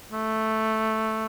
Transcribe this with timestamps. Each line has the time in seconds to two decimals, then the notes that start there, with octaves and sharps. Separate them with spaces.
0.12 A3